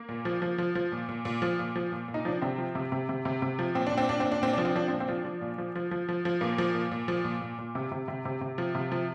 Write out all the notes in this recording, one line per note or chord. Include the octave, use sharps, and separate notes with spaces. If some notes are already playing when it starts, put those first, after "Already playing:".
Already playing: A#3
A#2
F3
F3
F3
F3
A#2
A#2
A#2
F3
A#2
F3
A#2
A#2
D#4
F3 D4
C3 C4
F3
C3
C3
C3
C3
C3
F3
A#2 C4
D4
A#2
C4
A#2 D4
A#2 C4
D4
A#2 C4
F3 D4
C4
F3 D4
C4
A#2
C4
F3 D4
F3
A#2
F3
F3
F3
F3
F3
A#2 A#3
F3
A#2
A#2
F3
A#2
A#2
A#2
C3
C3
C3
C3
C3
F3
C3
F3